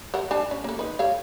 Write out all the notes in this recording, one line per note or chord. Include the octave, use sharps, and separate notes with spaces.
A4 A#4 F#5
D4 G#5 A5
C#4
A#3 A4
D#4 B4
A4 C#5 F5